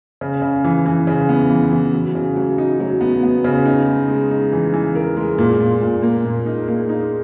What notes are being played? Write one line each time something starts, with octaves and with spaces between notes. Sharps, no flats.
C#3
C#3
E3
E3
C#3
B3
E3
E3
F#3
C#3
F#3
D#4
F#3
B3
B3
C#3
D#4
G#3
G#3
D#4
E3
E3
A#4
G#3
A#2
A#2
A#2
A#3
A#2
D#4
A#3
D#4